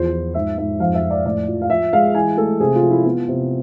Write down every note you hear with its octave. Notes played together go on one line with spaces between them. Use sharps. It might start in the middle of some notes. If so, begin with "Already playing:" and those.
Already playing: E2 F3 C5
F3
G#2 E5
G#2 E5
F2 F5
E5
F2
D5
A2 D5
F3
F5
F3 E5
G#3 F5
E3 G#5
A3 A4
C3 G#4
F4
F3
E4
B3 F4
C3